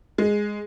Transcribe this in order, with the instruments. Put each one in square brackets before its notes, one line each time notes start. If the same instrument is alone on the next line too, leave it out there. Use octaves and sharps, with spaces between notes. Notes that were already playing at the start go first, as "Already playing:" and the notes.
[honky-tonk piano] G#3